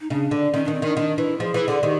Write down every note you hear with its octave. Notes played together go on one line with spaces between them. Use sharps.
D#4
C#3 D4
D3
D#3 C#4
D#3 D4
C4
D#3 D4
D#3 D4
E3
F3 G#4
E3
D3
D#3 G4